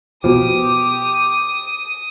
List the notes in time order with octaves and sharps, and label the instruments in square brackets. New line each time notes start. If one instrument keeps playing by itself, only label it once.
[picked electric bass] B2 F3 [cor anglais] G4 [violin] D#6